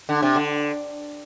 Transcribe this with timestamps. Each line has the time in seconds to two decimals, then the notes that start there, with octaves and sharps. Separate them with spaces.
0.09 D3
0.22 C3
0.36 D3